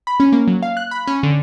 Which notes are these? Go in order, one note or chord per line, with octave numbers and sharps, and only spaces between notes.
B5
C#4
A#3
F#3
F5
F#6
B5
C#4
D3